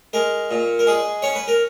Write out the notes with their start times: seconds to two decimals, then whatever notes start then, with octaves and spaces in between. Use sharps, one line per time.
0.13 G#3 A#4
0.51 A#2
0.79 A#4
0.87 G#3 G#4
1.22 C#4 C#5
1.35 B4
1.48 A#4